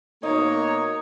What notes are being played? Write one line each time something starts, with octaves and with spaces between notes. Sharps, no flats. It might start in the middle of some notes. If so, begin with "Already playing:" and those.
B2 A#3 D#4 C#5